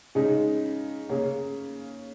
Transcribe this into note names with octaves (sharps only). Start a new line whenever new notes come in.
C#3 G#3 D#4
C#3 A#3 C#4